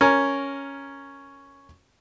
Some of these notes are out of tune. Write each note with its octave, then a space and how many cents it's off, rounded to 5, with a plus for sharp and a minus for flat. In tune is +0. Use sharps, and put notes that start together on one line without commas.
C#4 +0 A#4 +0